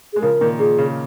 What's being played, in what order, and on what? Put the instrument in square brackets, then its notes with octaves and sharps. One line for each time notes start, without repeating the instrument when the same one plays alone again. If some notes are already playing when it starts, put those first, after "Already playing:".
[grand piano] G#3 [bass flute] G#4
[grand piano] C#3 F3 [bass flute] A#4
[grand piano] A#2 D#3
[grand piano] A#2 [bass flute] G#4
[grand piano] C#3